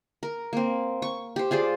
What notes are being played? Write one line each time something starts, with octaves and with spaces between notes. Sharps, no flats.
A#4
A#3 C4
C#6
G4 C5
F4 G#4 C5 D5